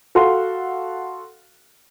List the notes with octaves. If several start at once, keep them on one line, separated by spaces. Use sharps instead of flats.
F#4 A4 F5 F#5 C6